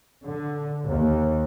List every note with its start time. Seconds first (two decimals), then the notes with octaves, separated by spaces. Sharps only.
0.24 D3
0.87 D#2